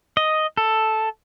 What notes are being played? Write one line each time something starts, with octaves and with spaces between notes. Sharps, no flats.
D#5
A4